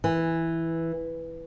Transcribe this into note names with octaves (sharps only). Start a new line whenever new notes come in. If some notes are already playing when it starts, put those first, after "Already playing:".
E3